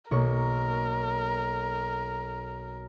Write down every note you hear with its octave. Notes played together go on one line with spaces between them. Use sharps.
B1 A#3 A#4 C#6